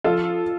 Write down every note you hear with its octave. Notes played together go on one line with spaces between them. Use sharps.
F3 F4 A4